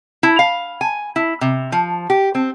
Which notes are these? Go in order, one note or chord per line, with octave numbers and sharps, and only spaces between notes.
E4
F5
G#5
E4
C3
F3
G4
C4